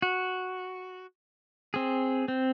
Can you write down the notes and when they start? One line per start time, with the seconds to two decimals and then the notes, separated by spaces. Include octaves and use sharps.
0.02 F#4
1.74 C4 G#4
2.28 C4